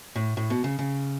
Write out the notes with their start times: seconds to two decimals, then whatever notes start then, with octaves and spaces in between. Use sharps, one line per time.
0.16 A2
0.37 A2
0.50 B2
0.64 C#3
0.79 C#3